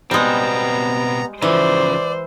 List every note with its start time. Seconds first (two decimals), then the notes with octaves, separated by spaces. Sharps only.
0.11 B2 G3 G#3 B3 C4 A#5
1.42 C#3 E3 F3 C5 D5